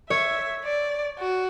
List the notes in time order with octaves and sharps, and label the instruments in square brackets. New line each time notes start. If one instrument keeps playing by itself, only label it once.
[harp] C#5 [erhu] E5
[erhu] D5
F#4